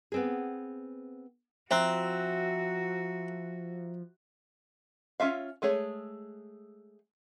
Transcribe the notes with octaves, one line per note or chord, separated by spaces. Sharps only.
B3 C4 G#4
F3 C4 F#4 E5 A#5 F#6
C#4 F4 E5 F5
G#3 A3 G#4 C#5